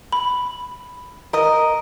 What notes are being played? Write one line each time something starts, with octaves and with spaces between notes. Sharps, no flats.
B5
A#4 D#5